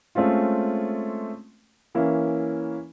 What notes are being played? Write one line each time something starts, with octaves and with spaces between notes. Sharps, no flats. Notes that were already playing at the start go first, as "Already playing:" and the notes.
G#3 A3 C4 C#4 F4
E3 A#3 C#4 E4